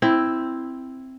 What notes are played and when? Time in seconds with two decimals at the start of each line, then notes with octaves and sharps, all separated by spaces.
0.02 C4 E4